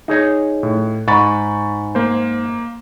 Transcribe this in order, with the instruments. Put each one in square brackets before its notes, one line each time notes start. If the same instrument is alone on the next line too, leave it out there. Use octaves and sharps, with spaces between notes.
[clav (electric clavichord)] D#4 G#4 C#5
[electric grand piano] A2
[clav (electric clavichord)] G#2 [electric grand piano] B5 C#6 A6
[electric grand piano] A#3 C5